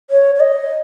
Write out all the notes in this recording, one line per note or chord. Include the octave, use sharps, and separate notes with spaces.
C#5
C#5
D#5